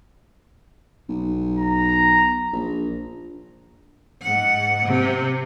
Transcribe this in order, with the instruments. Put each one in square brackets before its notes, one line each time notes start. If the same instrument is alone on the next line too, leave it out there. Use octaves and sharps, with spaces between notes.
[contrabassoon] B1
[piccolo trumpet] A#5
[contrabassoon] A#1
[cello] G#2 F#5
C3